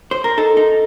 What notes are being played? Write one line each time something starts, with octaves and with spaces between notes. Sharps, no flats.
C5
A#4
D#4 A4
D#4